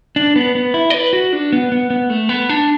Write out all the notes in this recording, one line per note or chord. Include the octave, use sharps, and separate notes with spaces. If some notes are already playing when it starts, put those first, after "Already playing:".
D4
B3
B3
E4
D5
B4
F#4
D4
B3
B3
B3
A3
B3
D4